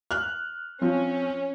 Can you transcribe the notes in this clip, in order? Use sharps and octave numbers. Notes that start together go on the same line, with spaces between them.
F6 F#6
F3 C4 C#4